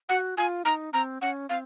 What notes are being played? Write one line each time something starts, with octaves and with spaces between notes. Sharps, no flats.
F#4 F#5
F4 G#5
D#4 A#5
C4 A#5
C#4 F#5
C4 F5